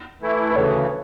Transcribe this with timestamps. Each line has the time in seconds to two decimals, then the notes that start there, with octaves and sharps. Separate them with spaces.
0.21 E3 A3 E4
0.51 B4
0.56 D2 C#3 E3 A4 C#5